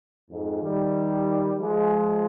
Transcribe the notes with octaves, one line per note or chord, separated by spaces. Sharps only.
F2 G#2
D#3 G3
F3 G#3